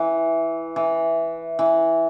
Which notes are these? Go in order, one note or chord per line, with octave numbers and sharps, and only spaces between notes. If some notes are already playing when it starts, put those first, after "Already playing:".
Already playing: E3
E3
E3